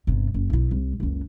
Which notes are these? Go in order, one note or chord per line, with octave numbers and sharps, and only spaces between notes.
G1 C3
F#1
B1 E4
C2
F#1 C#2